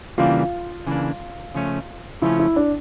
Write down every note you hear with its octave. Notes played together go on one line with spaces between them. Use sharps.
C#3 E3 G3 A#3 D4 F4
C#3 E3 G3 A#3 D4
C#3 F3 A3 C#4
C#3 F3 A3 C#4 E4
E4
D4